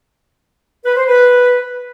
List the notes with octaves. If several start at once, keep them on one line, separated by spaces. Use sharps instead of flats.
B4
C5
B4